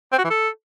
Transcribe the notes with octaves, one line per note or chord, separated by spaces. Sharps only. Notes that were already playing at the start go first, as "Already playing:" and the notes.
C4
F#4
E3
A4